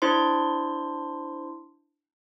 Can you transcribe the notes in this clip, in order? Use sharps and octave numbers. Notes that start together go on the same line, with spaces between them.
D4 E4 C5 C6